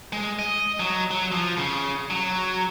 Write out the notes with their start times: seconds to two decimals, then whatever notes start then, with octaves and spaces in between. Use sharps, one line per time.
0.13 G#3
0.39 D#5
0.80 F#3
1.11 F#3
1.32 F3
1.57 C#3
2.10 F#3